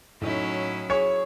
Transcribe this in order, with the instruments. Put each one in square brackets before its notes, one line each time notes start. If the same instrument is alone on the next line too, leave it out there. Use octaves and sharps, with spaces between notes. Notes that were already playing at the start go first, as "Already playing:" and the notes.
[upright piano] A2 D#4 [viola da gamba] F#3 C#4 E4
[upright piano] G#4 C#6 [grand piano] C#5